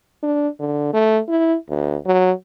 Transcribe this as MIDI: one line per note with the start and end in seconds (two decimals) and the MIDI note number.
0.23 0.48 62
0.60 0.93 50
0.94 1.20 57
1.29 1.56 64
1.69 1.96 38
2.06 2.32 54